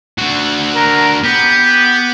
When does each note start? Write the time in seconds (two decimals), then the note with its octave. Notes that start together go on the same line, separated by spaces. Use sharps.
0.18 D3 F#4
0.76 A#4
1.24 B3 G4